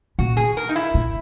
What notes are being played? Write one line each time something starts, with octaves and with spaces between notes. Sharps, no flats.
A#2 F#4
G#4
A#4
D#4
E4
A#2